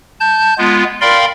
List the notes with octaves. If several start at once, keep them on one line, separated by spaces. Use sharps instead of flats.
A5 G6
G#3 B3 F4
A#4 D5 F5 G5 B5 C6